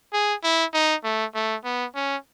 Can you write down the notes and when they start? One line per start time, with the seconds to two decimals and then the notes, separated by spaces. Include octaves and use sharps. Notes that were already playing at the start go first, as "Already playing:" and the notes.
0.13 G#4
0.44 E4
0.74 D#4
1.04 A3
1.35 A3
1.64 B3
1.95 C#4